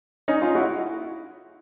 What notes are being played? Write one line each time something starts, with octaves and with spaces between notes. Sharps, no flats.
C#4 D#4
D#4 F4
E4 F#4